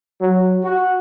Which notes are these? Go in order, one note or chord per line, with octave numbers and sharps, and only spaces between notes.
F#3
F#4